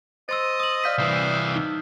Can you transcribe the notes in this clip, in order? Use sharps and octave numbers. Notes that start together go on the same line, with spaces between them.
C5 D#5 C6 E6 A6
D#6 F#7
D5 F5 D#6 F6 G6 B6
C2 E3 C5
D#4